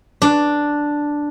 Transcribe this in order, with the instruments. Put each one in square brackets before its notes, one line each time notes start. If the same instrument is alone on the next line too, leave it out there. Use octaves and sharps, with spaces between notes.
[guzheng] D4